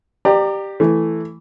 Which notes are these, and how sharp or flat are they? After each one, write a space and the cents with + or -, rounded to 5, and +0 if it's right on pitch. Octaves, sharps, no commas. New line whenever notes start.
G4 +0 D5 +30 A#5 -10
E3 +0 A3 +0